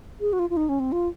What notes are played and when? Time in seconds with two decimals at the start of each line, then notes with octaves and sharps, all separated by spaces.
0.21 G#4
0.33 F#4
0.39 F4
0.50 F4
0.57 D#4
0.69 C#4
0.80 C4
0.92 F4